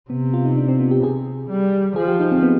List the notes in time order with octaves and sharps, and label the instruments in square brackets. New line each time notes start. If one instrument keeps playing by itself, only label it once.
[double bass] C3 [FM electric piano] B3
[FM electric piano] F4
D#4
D4
C4
B3
G4
[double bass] C3 [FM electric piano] G#4
[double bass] G3
[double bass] F3 [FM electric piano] G#4
[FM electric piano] G4
D#4
C4
B3